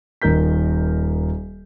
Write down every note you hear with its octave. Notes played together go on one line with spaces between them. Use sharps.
D#1 D#3 A#4 G6 B6